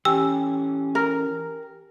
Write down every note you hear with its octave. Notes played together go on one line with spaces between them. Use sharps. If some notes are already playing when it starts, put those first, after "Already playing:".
E3 C#4 G4 G5 G#5 E6
A#4